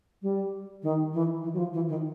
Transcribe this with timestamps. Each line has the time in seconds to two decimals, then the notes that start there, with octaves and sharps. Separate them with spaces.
0.22 G3
0.83 D#3
1.13 E3
1.43 E3
1.54 F#3
1.58 F3
1.73 E3
1.88 D#3